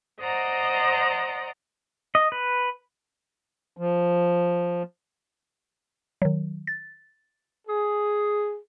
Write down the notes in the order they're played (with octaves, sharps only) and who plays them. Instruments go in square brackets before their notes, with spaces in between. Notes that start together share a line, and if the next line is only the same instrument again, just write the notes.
[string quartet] C5 D5 D#5 F#5 A#5
[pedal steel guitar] D#5
B4
[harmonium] F3
[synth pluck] D#3 F#3
A6
[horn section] G#4